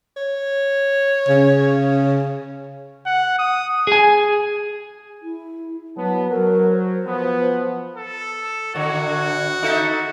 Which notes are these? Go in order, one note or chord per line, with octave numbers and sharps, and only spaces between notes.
C#5
C#3
F#5
D#6
G#4 G#5
E4
F#3 B3 A5
F#3 A#4
C5
F3 B3
A4
A2 D3 F#4
D#4 A4 E5